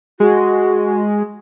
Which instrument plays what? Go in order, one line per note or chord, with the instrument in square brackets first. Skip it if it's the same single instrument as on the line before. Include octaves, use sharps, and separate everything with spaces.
[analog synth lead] G#3 [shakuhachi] F#4